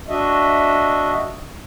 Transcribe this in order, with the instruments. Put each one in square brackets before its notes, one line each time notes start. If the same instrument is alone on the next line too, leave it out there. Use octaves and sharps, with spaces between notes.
[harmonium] D4 F#4 D#5 E5